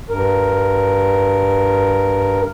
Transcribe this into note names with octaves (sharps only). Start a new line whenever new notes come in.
G2 A#4